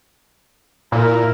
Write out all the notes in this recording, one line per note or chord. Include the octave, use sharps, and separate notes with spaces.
A#2 E4 A#4